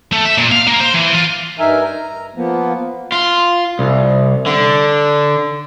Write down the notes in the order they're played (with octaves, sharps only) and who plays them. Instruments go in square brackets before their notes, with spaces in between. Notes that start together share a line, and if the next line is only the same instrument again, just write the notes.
[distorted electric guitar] A3
E5
A#2
F5
A#3
C5
E3
F4
[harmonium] G2 D#4 A#4 E5 G#5
A#5
F3 A#3 B3
[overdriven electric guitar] F4
C2
D3